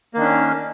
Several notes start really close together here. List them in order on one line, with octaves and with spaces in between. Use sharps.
A#3 D#3 D4 C#4